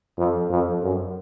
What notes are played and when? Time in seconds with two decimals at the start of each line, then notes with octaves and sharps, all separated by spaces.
0.18 F2
0.50 F2
0.82 F#2